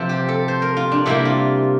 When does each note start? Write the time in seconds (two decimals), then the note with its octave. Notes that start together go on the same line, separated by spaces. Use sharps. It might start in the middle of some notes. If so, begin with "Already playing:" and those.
Already playing: C3 F3 C4
0.09 G4
0.29 A4
0.48 C5
0.62 A#4
0.77 F4
0.92 D4
1.06 C3 G3 A#3 E4
1.25 F4